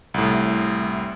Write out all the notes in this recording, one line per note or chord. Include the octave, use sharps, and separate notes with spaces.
C2 A2